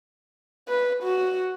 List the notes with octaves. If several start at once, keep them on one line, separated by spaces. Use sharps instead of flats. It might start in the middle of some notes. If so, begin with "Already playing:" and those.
B4
F#4